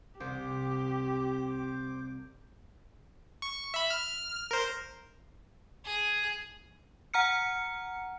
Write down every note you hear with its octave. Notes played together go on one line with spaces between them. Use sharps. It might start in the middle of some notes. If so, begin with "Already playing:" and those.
C2 G4 C5 D6
C#6
E5 B5
F6
A#4 C5
G#4
F#5 A#5 F6 C#7